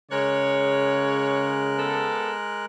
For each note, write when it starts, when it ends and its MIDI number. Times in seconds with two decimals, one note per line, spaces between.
0.11 2.15 49
0.11 2.66 56
0.11 2.66 70
0.11 1.68 73
0.11 2.66 90
1.78 2.32 59
1.78 2.32 69